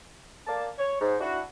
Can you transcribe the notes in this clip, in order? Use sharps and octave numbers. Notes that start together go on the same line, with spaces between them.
A#3 D5 A5
C#5
G#2
D4 E4 F#4